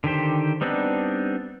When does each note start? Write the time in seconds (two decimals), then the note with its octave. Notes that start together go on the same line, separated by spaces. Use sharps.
0.04 D3 D#3 G4 C5
0.61 G3 B3 C4 D4 D#4